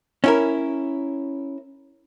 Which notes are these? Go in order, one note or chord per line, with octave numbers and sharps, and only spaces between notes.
C#4 E4 A#4